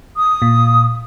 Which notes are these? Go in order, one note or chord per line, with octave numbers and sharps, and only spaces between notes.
D#6
A#2